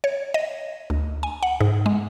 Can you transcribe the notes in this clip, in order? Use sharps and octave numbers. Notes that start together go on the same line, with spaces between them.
C#5
D#5
D2
G#5
F#5
G#2
G#3